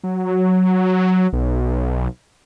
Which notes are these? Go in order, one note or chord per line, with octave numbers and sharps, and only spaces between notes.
F#3
B1